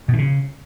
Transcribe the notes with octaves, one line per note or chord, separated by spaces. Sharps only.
B2
E3
C#3